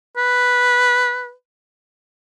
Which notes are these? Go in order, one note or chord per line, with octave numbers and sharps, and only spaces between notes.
B4